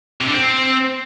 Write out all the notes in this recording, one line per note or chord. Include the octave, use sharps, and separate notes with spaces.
C3
D3
C4